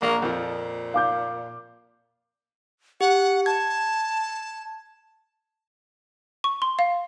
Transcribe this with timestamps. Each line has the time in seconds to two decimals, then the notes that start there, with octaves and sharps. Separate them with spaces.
0.02 A#1 A#3
0.22 F2 A#2 F3
0.94 F5 D6 G6
3.01 G4 F#5
3.46 A5 G#6
6.44 C#6
6.62 C6
6.79 F5